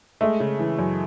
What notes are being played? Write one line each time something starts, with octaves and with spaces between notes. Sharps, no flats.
G#3 A3
C#3
E3
F#2